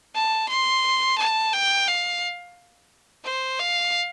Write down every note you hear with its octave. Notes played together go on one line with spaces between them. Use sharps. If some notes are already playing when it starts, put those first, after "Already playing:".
A5
C6
A5
G5
F5
C5
F5